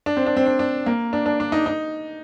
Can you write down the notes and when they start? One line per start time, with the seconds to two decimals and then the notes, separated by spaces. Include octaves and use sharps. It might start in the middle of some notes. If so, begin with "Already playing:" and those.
0.06 D4
0.17 C4
0.26 D4
0.36 C4
0.46 D4
0.59 D4
0.86 A#3
1.13 D4
1.26 D4
1.40 D4
1.52 D#4
1.66 D#4